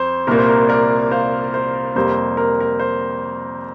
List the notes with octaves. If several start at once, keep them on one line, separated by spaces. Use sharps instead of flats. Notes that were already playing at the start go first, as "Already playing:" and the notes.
Already playing: F2 C5
C2 A#2 A#3 A#4
C5
A#4
A#4 D5
C5 F5
C5
F2 C3 G3 A#3 C5
A#4
A#4
C5